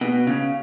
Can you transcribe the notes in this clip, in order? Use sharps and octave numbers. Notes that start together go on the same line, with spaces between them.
B2
C#3